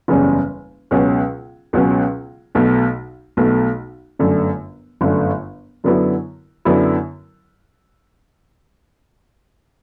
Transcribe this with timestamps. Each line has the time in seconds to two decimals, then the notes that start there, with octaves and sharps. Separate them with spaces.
0.08 F#1 E2 C#3 G3 C#4
0.91 C#2 B2 F#3 C#4
1.73 C#2 B2 F#3 C#4
2.55 B1 B2 A3
3.37 B1 B2 A3
4.19 G1 F#2 D3 A3
5.01 G1 F#2 D3 A3
5.84 F#2 D3 F#3 B3 E4
6.65 F#2 D3 F#3 B3 E4